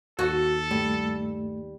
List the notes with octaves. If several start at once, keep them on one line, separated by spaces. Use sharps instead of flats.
D#2 F#4 A4
G2 G3 A3